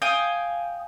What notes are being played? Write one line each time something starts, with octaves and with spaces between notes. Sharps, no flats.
F5 G5 G#5 D#6